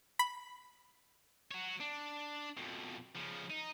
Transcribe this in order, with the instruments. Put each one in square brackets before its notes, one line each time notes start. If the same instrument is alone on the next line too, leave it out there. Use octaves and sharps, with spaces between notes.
[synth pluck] B5
[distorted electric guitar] F#4 C#5
D4
F2 B2
C#3 F3
D#4